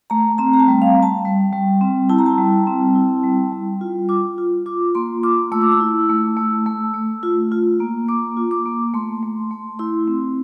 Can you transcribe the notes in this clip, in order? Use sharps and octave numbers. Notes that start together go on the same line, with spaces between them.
A3 A#5
C4 A#5
A#5
A5
G3
F5
G3
A5
G3
G3
C4
E4 A5
A#5
A5
G3
C4
E4
G3
G3
F4
F4 D6
F4
F4 D6
A#3 C6
F4 D6
A3 E6
D6
E6
E4
A3
A3
A3
A3
F4
F4
A#3
A#3 D6
F4
D6
A#3
A3 C6
A3
A3
E4 C6
C4